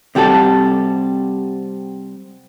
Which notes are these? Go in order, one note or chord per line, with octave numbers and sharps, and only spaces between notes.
C3 G3 F#4 A4